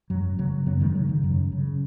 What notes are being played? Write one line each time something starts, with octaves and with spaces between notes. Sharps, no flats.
F#2 F#3
C#3 F#3
F#2 F#3 B3
D#3 G#3
C#3 F#3
D#3
F#2 F#3
C#3